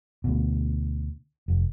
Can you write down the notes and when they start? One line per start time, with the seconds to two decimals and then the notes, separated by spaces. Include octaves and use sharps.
0.24 D2 B2
1.48 F1